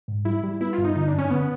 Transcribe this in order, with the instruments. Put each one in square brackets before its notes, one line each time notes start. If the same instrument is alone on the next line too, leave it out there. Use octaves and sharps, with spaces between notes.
[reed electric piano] G#2
[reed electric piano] G3 [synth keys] E4
[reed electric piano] G3
[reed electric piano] B3 [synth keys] E4
[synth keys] F4
[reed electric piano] G2
[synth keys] D#4
[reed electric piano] D3 [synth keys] D#4
[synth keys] D4
[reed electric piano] F#2 [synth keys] C#4
[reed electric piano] D3 [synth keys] B3